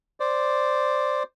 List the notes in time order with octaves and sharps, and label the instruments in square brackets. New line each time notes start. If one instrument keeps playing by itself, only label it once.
[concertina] C5 D5